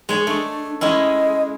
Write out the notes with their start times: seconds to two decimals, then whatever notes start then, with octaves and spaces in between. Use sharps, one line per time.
0.09 G#3 G#4 C#5
0.27 A3 D4
0.81 G#3 C#4 E4 D#5